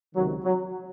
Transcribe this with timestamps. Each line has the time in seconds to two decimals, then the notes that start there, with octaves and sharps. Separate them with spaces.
0.14 C#2 C3 D#3 F#3
0.43 F#3